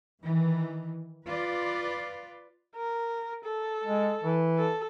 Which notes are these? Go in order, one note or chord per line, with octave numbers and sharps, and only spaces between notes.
D#3 E3
F4 B4 D5
A#4
A4
G#3
E3
A4